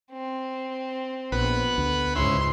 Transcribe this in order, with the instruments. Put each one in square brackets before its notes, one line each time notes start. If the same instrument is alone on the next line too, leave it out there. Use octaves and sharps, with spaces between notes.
[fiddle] C4
[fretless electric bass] A#1 [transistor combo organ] B3 B4 F#5
[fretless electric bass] D2
[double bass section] C#2 G#2 [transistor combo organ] C#4 E4 [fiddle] C6